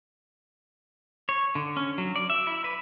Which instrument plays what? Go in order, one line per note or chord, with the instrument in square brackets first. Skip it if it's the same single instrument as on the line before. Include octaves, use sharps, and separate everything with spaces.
[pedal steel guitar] C#5
D3
C#4
F#3
D5
E5
E4
B4